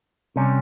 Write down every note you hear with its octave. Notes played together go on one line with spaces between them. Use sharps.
C3 G3 C#4